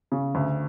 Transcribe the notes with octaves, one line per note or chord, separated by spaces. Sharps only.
C#3
D2